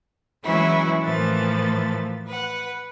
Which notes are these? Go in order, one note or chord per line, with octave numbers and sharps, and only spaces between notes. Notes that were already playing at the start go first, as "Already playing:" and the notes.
E3 F#3 G#3 C#4 E4 F#4
A2 E3 F3 A#3 A6
B4 F#5